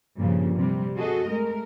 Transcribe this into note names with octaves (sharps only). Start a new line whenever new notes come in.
G2 A#2 C#3 F3
C3 G3
F#4 G#4 A4 D#5
G#3 A3 A#4